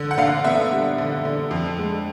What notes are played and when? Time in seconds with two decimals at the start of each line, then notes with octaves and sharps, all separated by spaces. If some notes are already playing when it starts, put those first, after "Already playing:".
Already playing: D3
0.11 F#5
0.18 D3 F5
0.44 B3 E5
0.72 G3
0.98 D3
1.25 D3
1.51 F2
1.79 G#3